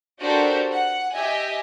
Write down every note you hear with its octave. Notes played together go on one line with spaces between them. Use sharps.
D4 F#4 G4 A4 A#4 C5
F#5
G4 D#5 E5 G#5